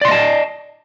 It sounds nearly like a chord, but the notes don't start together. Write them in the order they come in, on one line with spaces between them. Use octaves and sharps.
D5 C6 D#5 A5